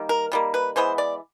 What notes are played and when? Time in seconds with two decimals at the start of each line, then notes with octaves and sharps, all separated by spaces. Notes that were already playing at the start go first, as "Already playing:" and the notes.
Already playing: D#3 G3 A#3
0.09 A#4
0.32 D#3 G3 A#3
0.54 B4
0.76 E3 G#3 B3 C5
0.98 D5